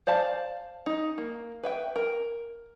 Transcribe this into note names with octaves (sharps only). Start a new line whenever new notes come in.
C5 D5 F5 A5
D#4
A#3
B4 E5 G5
A#4